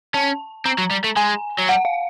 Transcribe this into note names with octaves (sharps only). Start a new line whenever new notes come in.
C#4 A5
C4 A#5
F#3
G3
A3
G#3 G#5
F#3
G3 F#5
F5